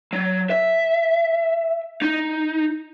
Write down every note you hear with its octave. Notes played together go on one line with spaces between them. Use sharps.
F#3
E5
D#4